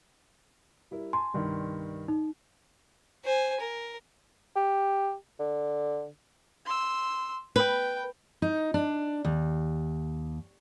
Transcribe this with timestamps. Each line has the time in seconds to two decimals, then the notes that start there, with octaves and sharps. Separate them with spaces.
0.91 G3 E4 A#4
1.13 G#5 A5 C6
1.34 C2 G2 D#3
2.08 D#4
3.24 C5 G#5
3.60 A#4
4.56 G4
5.39 D3
6.65 C6 E6
7.56 B4 G5
8.42 D#4
8.74 D4
9.25 D#2